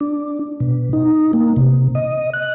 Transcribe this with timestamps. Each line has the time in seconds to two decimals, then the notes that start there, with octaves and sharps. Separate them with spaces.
0.01 D4
0.60 B2
0.93 D#4
1.33 A#3
1.56 C3
1.95 D#5
2.34 F#6